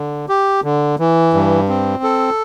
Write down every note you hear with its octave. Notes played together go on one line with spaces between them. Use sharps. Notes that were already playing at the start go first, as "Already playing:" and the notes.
Already playing: D3
G4
D3
E3
G2
C4
A4